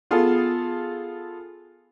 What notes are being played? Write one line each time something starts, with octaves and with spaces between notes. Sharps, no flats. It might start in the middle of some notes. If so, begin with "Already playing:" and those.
B3 F4 G#4 A4